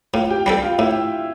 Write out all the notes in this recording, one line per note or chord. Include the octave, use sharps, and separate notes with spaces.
A2 F4 F5
G4 G5
G3 D4 G4 A4 G5
F4 F5
A2 E4 E5